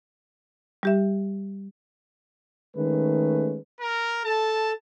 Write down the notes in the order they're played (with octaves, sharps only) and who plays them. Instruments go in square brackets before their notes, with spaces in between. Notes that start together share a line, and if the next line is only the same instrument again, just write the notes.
[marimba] G3 G4 E5
[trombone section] D#3 G#3 A3 C#4 B4
[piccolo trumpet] A#4
[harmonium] A4 [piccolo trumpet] A5